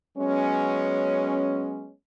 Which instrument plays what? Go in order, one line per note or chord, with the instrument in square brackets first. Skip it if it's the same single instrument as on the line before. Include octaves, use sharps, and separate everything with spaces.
[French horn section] F#3 G#3 B3 C#4